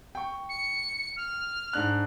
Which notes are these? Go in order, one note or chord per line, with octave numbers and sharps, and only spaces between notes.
G5 C#6
C#7
F6
G#2 D4 F#6